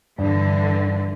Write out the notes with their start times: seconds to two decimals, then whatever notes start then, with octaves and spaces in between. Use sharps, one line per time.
0.18 G2 D3 E3